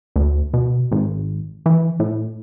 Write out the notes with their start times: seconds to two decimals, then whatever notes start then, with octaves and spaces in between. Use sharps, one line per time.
0.16 D2
0.53 B2
0.92 G#1
1.66 E3
2.00 A2